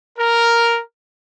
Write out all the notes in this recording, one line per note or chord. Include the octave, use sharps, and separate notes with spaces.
A#4